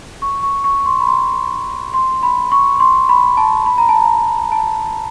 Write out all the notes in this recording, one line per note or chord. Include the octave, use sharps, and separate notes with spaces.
C#6
C#6
C#6
C6
B5
C6
C6
B5
C#6
C6
B5
A5
B5
A#5
A5
A#5
A5